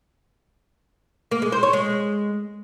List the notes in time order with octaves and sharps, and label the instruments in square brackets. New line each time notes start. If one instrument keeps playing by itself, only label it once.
[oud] A#3
G#3
C5
C#5
G#3